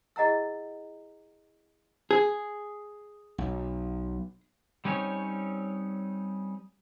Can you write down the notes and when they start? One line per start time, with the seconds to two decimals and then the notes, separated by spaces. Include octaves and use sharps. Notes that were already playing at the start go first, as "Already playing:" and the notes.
0.16 E4 G#4 D#5 F#5 A#5 E6
2.11 G#4
3.38 B1
4.85 G3 C4 C#4 D#4 C#5